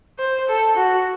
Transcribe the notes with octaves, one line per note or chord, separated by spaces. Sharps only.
C5
A4
F#4